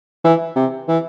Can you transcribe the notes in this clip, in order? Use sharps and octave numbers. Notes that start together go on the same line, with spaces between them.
E3
C3
E3